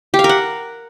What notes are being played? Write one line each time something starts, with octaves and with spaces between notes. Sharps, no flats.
G4
F5
A#4
F#5